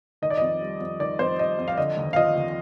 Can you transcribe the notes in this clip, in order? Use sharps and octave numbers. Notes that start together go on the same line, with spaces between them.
D#3 D#5
D5
F2 D#5
G3
F2
D#3 D5
F2 C5
G3 D#5
F2
F5
D3 D#5
D#2
F5
F3 D#5
D#2